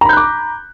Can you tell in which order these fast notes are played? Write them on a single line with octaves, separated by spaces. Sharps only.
A#5 B5 G6 F#6 D6